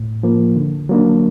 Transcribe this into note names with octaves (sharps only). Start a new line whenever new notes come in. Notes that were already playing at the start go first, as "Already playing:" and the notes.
Already playing: A2
F3 A#3
D3
F#3 A#3 D4